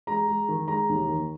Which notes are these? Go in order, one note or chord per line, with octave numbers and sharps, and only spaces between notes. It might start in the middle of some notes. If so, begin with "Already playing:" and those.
G#3 A#5
G#3
D#3
G#3 A#5
D#2
D#3